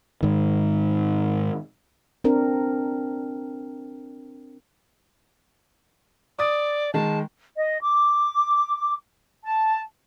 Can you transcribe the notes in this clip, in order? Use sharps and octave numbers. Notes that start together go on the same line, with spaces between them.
G#2 D#3
C4 D4 A#4
D5 D6 D#6 A6
D#3 G#3 A5
D#5
D6
A5